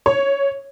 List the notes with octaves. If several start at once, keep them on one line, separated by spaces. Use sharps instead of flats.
C#5